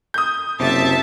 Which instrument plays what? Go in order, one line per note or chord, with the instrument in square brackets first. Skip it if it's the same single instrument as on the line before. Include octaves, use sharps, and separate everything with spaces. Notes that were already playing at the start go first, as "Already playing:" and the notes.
[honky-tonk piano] D#6 G6
[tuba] F#1 [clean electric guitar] C3 [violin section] E5 A5